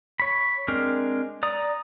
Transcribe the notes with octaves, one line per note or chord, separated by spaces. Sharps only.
C#5 B5
G#3 C4 D4 A#4
D5 A#5 D#6